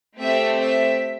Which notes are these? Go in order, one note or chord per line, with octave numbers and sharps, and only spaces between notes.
A3 C4 G4 E5
E5